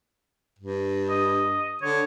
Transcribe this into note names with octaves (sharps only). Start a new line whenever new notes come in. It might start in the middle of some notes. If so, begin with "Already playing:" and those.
G2
D#5
D3 C#5